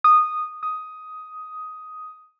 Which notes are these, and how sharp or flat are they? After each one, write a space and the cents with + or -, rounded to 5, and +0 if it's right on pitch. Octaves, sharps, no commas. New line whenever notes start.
D#6 -15
D#6 +10